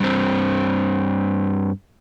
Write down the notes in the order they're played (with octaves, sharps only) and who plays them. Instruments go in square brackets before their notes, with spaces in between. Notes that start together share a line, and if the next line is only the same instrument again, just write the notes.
[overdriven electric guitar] G2 C4